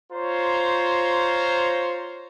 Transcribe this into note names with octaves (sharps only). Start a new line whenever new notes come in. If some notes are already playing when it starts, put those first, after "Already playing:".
F4 C5 C#5 A#5